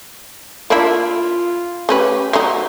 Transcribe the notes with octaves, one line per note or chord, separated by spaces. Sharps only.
A#3 D4 E4 F4
A3 C#4 G4 B4
F#3 A3 D#4 F#4